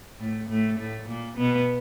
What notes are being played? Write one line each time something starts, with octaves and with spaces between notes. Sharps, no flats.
A2 A3
A2 A3
A2 A3
A#2 A#3
B2 B3